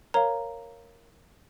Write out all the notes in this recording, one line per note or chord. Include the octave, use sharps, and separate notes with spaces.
A#4 C#5 F5 A#5